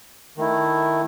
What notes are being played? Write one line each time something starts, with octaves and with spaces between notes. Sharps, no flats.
D#3 A3 E4